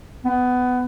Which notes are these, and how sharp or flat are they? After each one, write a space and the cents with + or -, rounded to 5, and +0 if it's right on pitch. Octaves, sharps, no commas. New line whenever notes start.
B3 +15